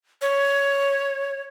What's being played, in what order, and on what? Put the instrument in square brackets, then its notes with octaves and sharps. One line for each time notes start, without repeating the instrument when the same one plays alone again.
[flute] C#5